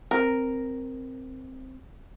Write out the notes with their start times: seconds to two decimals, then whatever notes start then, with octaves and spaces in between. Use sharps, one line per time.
0.11 C4 A#4